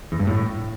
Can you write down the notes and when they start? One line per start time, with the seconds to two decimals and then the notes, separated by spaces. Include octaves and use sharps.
0.12 E2
0.19 G2
0.27 A2